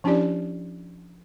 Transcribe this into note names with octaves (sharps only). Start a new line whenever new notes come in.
F3 C#4 D4 E4 G4 D5